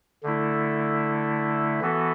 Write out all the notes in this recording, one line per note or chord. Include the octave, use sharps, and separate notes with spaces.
D3 A3 E4
E3 B3 F#4 A4